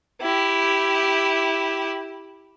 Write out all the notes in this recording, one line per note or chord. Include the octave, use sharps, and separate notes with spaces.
E4 G4